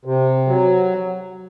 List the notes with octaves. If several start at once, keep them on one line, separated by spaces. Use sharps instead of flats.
C3
F#3